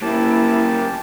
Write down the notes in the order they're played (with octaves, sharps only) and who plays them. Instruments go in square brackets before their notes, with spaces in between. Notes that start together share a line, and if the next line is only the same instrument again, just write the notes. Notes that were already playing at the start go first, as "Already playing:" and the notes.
[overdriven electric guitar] A#3 C#4 [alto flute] E4 [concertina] G4 A5